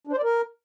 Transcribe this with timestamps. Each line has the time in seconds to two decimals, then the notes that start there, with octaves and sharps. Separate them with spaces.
0.07 D4
0.13 C5
0.18 D5
0.23 A#4